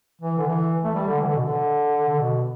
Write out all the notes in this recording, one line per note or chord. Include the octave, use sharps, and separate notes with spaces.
E3
D3
E3
A3
G3
D3
E3
D3
B2
D3
D3
B2